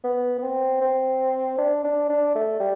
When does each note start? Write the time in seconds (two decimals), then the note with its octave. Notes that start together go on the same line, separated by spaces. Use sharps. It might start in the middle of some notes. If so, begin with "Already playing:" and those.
0.04 B3
0.38 B3
0.43 C4
0.81 C4
1.58 D4
1.84 D4
2.09 D4
2.35 A3
2.60 G3